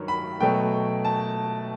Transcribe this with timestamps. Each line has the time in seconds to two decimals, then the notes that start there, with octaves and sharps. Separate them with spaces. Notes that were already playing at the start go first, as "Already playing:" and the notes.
Already playing: G2 D#3 F#3
0.08 B5
0.40 B2 F#3 A3 G5
1.05 A5